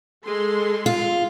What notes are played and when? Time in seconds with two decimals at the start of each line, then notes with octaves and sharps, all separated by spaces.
0.24 G#3 A4 C6
0.86 F4